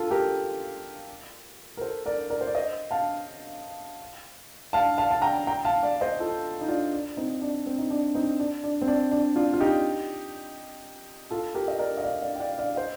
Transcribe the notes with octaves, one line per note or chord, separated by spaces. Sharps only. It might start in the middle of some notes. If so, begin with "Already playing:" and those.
Already playing: F4 A4
G4 A#4
A#4
A4 C5
A#4 D5
A#4 D5
C5
D5
C5 D#5
F5 A5
F5 A5
F5 A5
A5
G5 A#5
G5 A#5
F5 A5
D5 F5
C5 D#5
F4 A4
D#4
D4 F4
D4
C4 D#4
D4
C4
D#4
D4
C4 D#4
D4
D4
C4
D4
D4
D4 F4
F4
D#4 G4
F4 A4
G4 A#4
D#5
A#4 D5
D#5
D5 F5
D5 F5
G5
D5 F5
D5 F5
C5 D#5